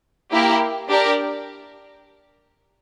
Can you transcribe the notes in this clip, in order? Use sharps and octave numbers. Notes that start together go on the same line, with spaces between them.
A#3 E4 G4 A#4
D4 G4 A#4 D5